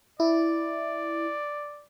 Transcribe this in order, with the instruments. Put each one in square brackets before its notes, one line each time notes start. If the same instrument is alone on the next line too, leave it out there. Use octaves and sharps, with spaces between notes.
[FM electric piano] E4 [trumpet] D5